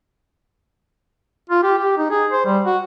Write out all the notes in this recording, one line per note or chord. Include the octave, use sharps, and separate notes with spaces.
F4
G4
G4
D#4
G#4
C5
G3
F#4